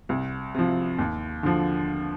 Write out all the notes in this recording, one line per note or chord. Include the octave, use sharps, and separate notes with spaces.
C2
C3 F3
D#2
D3 F3